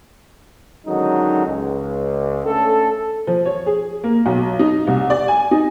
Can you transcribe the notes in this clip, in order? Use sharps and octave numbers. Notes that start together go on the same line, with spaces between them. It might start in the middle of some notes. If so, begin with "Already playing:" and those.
D3 D#3 F#3 G#3 C#4 D#4
C#2
A3 C#4 D4 A4
F3
C#5
G#4
A#3
B1
D#4
C2
D5
G#5
D#4